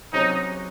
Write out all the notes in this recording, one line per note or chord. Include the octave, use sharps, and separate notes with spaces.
C3 F#3 C#4 D#4 G#4 C5